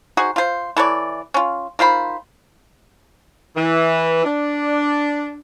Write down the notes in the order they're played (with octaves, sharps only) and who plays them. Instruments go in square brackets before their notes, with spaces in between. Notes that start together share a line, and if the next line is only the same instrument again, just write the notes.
[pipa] D#4 F#4 G#4 C5
F4 C5
E3 A4 C#5 D5
C#4 F4
D#3 F4 C5 B5
[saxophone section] E3
D4